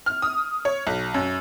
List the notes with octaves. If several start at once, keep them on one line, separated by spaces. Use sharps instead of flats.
F6
D#6
C#5
B1
F#2